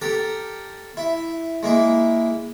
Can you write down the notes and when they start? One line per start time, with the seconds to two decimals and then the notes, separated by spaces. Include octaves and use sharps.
0.02 G4 A4 A#4
0.97 E4
1.63 G#3 A#3 E4